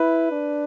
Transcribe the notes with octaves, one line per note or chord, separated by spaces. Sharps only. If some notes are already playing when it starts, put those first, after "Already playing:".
Already playing: E4 B4
D4